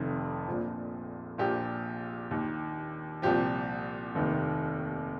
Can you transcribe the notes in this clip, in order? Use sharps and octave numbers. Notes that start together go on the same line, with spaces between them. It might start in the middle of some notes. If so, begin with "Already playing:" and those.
Already playing: F1 F2 C3 D#3
A#1 A#2 F3
A#1 A#2 F3 G4
D#2 D#3
C2 A#2 F3 G4
F1 D#2 D#3